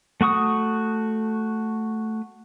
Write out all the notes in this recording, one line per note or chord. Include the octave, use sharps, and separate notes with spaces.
A3 F#4 C#6 D#6